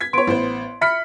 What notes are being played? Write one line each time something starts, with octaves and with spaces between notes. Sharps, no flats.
G#6 B6
B3 C#5 C6 D7
A1 B3 C5
E5 B5 F6 B6 C#7